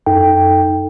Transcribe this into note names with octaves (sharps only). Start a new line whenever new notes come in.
F#2 D#4 A4 G5